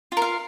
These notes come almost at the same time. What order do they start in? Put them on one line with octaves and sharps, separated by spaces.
F4 A#4 F5